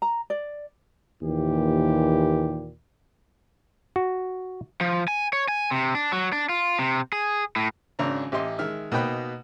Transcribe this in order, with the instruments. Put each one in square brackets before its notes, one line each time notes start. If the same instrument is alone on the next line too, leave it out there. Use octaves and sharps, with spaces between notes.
[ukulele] A#5
D5
[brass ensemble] D#2 A#2 E3 G4
[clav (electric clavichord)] F#4
[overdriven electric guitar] F3
G#5
C#5
G#5
C3
D4
F#3
D4
F4
C3
G#4
A2
[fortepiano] G#1 C#3 C#4 D4 A#5
A1 G4 D#5 C6
D#3 G#3 E5 F6
B2 A#3 D#4 G5 B5 F#6